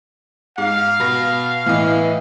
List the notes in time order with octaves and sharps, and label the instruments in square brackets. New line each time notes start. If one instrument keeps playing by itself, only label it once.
[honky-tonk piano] G#2 [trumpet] F5
[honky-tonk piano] B2 B5 A#6
[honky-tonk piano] A2 D#5 [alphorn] E3